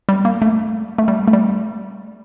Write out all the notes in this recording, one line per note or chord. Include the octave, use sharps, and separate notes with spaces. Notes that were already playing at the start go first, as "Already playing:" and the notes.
G3
A#3
A3
A3
G3
A3
G3